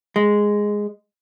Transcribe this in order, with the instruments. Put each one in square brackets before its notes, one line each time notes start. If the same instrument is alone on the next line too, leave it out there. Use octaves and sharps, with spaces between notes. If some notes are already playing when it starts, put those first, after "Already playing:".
[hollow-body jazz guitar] G#3